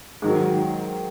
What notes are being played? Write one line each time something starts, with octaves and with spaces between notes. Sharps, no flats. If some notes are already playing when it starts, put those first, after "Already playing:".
G#2 D#3 F#3